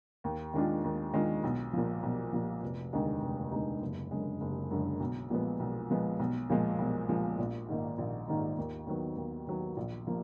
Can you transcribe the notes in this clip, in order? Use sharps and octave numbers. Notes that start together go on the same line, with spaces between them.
D#2
D#3 G#3 D4 F4
D#2
D#3 G#3 D4 F4
B1
A#2 F3
B1
A#2 F3
F1
D#2 D3 G#3 D#4
F1
D#2 D3 G#3 D#4
F#1
F#2 D3 G#3
F#1
F#2 D3 G#3
B1
A#2 F3 G#3 B3
B1
A#2 F3 G#3 B3
B1
A#2 F3 G#3
B1
A#2 F3 G#3
A#1
G#2 D#3 A#3 D#4
A#1
G#2 D#3 A#3 D#4
D#2
D#3 F#3 B3
D#2
D#3 F#3 B3
A#1
F3 A#3